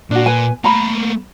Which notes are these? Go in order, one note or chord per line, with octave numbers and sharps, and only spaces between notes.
A#2 D4 F#4
B4 G#5
A3 A#3 A#5 B5